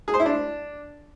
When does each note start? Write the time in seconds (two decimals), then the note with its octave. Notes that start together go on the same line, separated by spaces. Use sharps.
0.08 G#4
0.14 C5
0.20 E4
0.26 D4